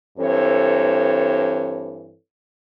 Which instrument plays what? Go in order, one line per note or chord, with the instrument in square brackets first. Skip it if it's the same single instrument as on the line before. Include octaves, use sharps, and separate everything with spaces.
[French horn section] G2 E3 C4 A4 C#5